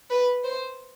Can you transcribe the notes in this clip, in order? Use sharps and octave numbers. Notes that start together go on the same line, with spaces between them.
B4
C5